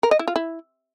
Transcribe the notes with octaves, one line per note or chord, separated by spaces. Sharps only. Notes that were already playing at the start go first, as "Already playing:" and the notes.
A#4
D#5
E4
F4
E4